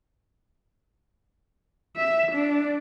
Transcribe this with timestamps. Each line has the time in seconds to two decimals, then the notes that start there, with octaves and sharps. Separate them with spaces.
1.96 E5
2.32 D4